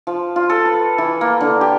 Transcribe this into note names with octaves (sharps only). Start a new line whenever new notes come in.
F3
F4
A4
B4
E3
A#3
D3
G4